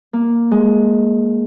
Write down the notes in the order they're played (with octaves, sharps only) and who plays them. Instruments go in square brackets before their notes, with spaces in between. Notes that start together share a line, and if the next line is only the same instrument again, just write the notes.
[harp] A#3
G#3